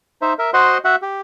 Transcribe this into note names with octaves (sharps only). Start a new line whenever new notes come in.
D#4 C5 E5
A#4 E5
F#4 C5 D#5 F#5 C6
F#4 E5 F#5
G4